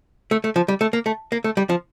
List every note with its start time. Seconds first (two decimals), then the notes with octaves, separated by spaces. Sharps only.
0.31 A3
0.44 A3
0.56 F3
0.68 G3
0.81 A3
0.93 A#3
1.06 A3
1.32 A#3
1.44 A3
1.57 G3
1.69 F3